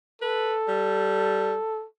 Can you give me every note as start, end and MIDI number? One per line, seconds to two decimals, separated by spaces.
0.22 1.86 69
0.22 0.54 71
0.68 1.55 55